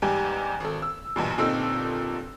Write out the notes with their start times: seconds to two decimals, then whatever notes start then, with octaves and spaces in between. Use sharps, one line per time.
0.02 E2 G#2 G3 G4 G#5
0.60 G#1 A4
0.82 E6
1.16 B1 E2 G2 A#2
1.38 G1 A#2 C4 D#4 A4 E6